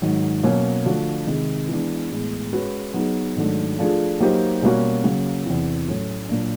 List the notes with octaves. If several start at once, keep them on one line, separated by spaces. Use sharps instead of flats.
G#2 D#3 F#3
B2 F#3 A#3 C#4
D3 F3 A3 D4 F#4
C3 D#3 G#3
E3 G#3 B3 D4
A2 E3 G#3 B3
G#3 C#4 F#4 B4
F#3 B3 D#4 G#4
G#2 D#3 F#3 A3 D4
F3 A3 D4 F4 G#4
F#3 A#3 D#4 G4 C5
B2 G3 A#3 C#4 F#4
C#3 F#3 A#3
E2 C3 E3
A2 F#3 A3 C#4
A#2 F#3 A#3 D4